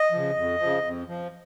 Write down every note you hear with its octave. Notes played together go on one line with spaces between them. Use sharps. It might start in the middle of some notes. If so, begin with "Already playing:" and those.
Already playing: D#5
C#3 F3
F2
C#3 F3
F2
F3